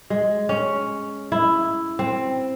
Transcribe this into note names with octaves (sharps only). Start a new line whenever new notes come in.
G#3
C#4
E4
C4